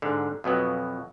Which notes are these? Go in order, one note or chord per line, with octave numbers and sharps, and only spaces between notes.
G#2 D3
F2 B2 F#3 B3